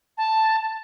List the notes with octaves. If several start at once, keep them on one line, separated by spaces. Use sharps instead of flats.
A5